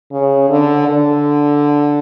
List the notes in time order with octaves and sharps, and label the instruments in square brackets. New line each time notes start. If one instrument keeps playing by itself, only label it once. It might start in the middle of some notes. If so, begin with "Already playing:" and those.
[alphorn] C#3
D3
D3